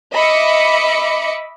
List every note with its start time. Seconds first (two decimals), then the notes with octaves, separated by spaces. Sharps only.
0.14 D#5 E5 B5 D6 C#7